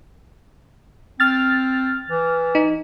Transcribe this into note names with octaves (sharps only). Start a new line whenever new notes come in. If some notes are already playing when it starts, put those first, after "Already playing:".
C4 F6 A6
E3
D#4